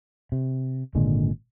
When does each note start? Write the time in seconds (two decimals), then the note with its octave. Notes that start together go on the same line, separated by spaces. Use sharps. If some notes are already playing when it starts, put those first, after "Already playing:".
0.32 C3
0.95 G#1 A#2 D3 G#3